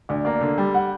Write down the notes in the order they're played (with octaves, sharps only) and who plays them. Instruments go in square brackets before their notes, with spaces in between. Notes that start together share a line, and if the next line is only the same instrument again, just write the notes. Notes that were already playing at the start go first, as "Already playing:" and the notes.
[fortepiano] D2 [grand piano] D5
[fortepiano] A#3 [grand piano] D5
[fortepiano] D3
G3
[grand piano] F#5